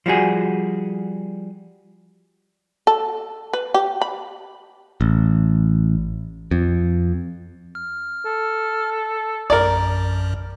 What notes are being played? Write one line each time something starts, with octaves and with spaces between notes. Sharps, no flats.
F3 G3 F#4 G#4
A4
B4
G4
B5
A1
F2
F6
A4
A#1 F#2 A#4 D5